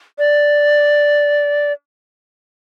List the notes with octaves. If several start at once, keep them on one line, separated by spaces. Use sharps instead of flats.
D5